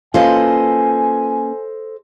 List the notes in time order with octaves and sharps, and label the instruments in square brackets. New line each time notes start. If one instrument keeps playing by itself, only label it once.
[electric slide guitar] A#3 C#4 B4 [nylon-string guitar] F4 [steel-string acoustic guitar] A4 C5 D#5 [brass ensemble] G#5